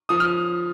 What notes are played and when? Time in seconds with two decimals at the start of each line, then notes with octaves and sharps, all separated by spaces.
0.09 F3 D#6
0.20 F6